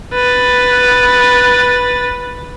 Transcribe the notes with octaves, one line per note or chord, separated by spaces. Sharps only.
B4 A6